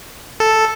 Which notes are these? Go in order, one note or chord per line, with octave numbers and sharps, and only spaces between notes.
A4